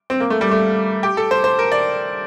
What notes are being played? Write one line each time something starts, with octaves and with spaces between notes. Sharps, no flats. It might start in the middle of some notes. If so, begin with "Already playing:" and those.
C4
A#3
A3
G3
A3
G4
A4
C5
C5
A#4
D5